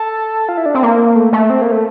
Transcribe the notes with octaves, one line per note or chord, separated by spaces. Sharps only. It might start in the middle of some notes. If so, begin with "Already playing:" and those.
Already playing: A4
F4
E4
D4
C4
A#3
A3
A3
C4
A#3
A3